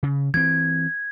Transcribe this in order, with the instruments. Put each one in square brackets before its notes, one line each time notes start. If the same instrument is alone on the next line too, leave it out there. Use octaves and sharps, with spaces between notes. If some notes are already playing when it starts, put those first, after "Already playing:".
[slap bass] C#3
[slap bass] E3 C4 [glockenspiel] G#6